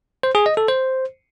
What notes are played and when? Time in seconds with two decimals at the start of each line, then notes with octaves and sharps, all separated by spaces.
0.23 C5
0.35 G#4
0.46 D#5
0.57 A4
0.68 C5